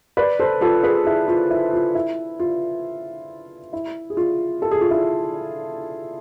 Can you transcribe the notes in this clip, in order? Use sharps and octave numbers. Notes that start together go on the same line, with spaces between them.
B4 D5
A4 C5
F4 A4
G#4 B4
E4 G#4
F4
E4
F4
E4
F4
E4
G#4
F4
A4
G#4
F4
E4 G#4